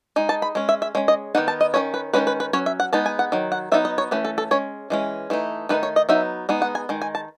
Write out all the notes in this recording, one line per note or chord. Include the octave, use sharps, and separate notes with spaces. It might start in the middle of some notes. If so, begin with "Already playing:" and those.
G#3 D#4
A5
B5
G#3 C#4
E5
E5
G#3 C#4 C#5
D#5
D#3 G#3 B3 D#4 F#5
A5
D#5
D#3 A3 C#4 C#5
B4
D#3 G#3 C#4 B4
B4
B4
F#3 C#4 C#5
E5
F#5
G#3 B3 D#4 A5
G#5
F#5
D#3 F#3
F#5
F#3 B3 D#4 E5
D#5
C#5
E3 A3 C#4 B4
A4
A4
G#3 C#4 C#5
E3 G#3 C#4
E3 A3 D#4
D#3 A3 D#4 B4
C#5
D#5
F#3 B3 D#4 E5
G#3 B3 D#4
F#5
G#5
D#3 G#3
G#5
A5